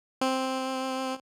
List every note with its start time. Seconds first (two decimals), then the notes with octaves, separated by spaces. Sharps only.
0.21 C4